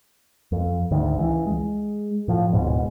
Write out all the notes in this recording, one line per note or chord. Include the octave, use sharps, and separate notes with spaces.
F2
D2 G#2 D#3
C#2 E3
G#3
A2 F3
D1 G#2 B2